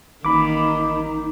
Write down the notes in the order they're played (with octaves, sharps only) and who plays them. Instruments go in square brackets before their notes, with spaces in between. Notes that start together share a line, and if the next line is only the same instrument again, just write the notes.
[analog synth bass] A1 [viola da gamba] D#3 A#3 [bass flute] D#4 [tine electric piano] B5 D6